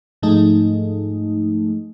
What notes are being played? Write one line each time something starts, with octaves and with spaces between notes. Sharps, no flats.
G#2 F3 G#3 A3 D#4